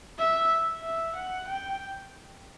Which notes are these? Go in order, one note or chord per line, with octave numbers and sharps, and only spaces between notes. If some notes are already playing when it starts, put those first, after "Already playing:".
E5
E5
F#5
G5